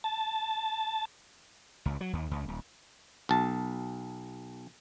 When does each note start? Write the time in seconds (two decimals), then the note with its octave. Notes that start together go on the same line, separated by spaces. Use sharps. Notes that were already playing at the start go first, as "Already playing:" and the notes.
0.04 A5
1.86 C#2
2.01 F#3
2.13 D#2
2.31 C#2
2.48 D#1
3.29 B1 A5